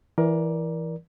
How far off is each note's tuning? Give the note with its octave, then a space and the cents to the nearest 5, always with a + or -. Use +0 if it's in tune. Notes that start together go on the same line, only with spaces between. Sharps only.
E3 +0 A#4 +20 D5 +0